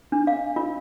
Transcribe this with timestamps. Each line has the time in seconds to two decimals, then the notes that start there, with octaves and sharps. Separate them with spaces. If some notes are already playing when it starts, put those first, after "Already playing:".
0.12 D4
0.27 F5
0.56 F4